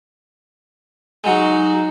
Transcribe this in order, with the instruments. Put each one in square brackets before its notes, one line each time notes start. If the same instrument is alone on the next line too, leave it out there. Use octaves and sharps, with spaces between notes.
[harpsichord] F#3 G#3 [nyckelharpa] D#4 F#4